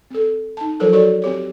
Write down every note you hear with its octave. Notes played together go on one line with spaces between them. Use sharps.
C4 A4
D#4 A5
F3 F#3 F4 A4 A#4 C5
F#4 A4 C#5 D5
C4 G4 C#5